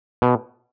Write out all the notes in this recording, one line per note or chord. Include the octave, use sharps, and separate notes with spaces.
B2